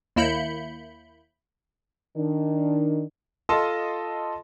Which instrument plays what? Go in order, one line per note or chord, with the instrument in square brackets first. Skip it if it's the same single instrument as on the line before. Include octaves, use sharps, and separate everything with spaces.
[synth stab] D#2 A#3 E4 B5 G6 C#7
[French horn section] D#3 D4
[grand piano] F4 A4 D#5 A5 C6